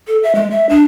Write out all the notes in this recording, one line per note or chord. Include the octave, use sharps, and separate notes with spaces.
A4
E5
G#3
E5
D4